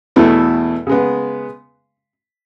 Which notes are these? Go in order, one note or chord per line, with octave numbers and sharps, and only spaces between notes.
E2 B2 A3 E4
C#3 G#3 B3